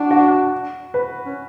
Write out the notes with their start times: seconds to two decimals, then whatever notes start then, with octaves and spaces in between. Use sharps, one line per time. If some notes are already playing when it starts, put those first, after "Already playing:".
Already playing: D4 F#4
0.11 F#4
0.94 B4
1.25 C#4